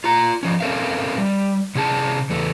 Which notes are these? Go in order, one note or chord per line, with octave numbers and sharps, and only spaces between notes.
F4 A#5
F3 C#4
C4 C#4 A4 A#4 E5 F5
G3
C3 C#4 G#4 A5
E2 A3